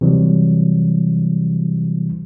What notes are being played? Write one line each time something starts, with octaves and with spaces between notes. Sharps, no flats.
C3 E3 F#3 G3